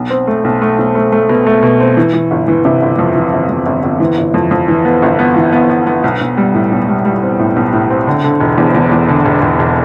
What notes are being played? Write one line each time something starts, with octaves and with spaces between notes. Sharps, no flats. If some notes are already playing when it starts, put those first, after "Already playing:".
Already playing: B1
C4
A3
B1
A3
B1
A3
A3
B2
A3
B2
C4
E3
E3
G1
E3
C3
G1
F2
E3
G1
F2
G1
G1
E3
G1
F2
F2
E3
B3
G1
B3
E3
B3
B3
B3
B1
B1
G3
A2
B1
G3
G3
C4
A2
B1
A2
C4
D3
D3
E1
E2
E2
E2
D3
E1
E1
E1